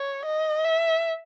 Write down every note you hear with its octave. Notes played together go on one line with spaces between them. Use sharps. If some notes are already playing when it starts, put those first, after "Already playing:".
Already playing: C#5
D#5
E5